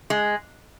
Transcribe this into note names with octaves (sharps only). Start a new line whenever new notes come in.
G#3